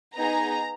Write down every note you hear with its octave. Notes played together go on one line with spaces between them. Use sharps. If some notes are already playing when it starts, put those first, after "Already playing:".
B3 D#4 G#4 A#5